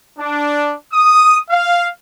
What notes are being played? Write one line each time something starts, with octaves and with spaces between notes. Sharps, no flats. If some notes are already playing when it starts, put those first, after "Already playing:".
D4
D#6
F5